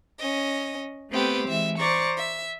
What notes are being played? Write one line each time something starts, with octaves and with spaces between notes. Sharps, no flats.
C#4 D#5
A3 B3 C4 G4 B4
E3 G#3 E5
C5 D5 A#5 C#6
E5